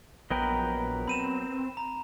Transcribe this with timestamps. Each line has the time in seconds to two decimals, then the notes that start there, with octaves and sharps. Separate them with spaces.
0.30 A#1 F#3 B3 A#4 B4 D#5 G5
1.08 C4 B5 D#7 E7
1.77 A#5